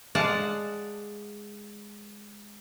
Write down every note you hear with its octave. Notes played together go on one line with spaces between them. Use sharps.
G#3 D5 F5 F#5 A5